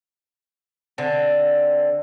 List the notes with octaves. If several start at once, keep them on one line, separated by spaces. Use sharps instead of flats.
D3 C4